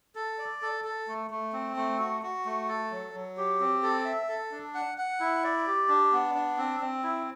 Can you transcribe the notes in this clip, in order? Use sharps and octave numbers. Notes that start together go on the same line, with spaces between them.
A4
D5
A4
A4
A3
A3
C4
A3
F#4
F#4
A3
A4
F#3
F#3
G4
C4
A4
E5
A4
D4
F#5
F#5
E4
D5
G4
D4
B3
D4
C4
C4
E4